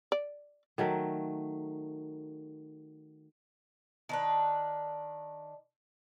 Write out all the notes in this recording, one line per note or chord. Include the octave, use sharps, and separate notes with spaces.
D5
D#3 F#3 A3 A#4
D#3 D4 B4